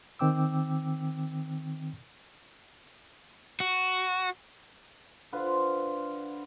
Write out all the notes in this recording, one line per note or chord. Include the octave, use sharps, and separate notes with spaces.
D#3 C4 G5 D6 E6
F#4
D3 F4 B4 C5